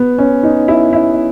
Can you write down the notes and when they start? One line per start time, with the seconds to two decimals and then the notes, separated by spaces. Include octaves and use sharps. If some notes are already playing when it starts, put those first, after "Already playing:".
Already playing: B3
0.18 C#4
0.43 D#4
0.68 E4
0.93 E4